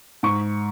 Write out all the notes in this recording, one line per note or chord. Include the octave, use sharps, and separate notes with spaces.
G#2 C#6